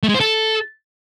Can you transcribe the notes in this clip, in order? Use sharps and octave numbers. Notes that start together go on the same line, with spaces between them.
A3
G#3
C5
A4